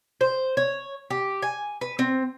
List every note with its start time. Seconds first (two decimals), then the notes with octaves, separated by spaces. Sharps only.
0.21 C5
0.57 C#5
1.10 G4
1.42 G#5
1.81 B4
1.99 C4